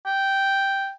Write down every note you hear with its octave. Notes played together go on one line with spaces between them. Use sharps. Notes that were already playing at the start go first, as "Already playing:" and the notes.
G5